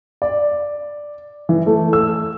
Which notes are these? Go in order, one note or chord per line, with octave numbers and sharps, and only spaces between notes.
D5
E3
A3
E6